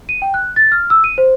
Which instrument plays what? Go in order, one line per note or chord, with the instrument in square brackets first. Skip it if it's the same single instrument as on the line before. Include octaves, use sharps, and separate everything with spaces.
[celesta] D#7
G5
F#6
A6
F6
E6
D#7
C5